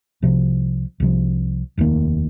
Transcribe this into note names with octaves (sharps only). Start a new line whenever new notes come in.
C2 C3 F3
C2 C3 F3
F1 D#2 D#3 A#3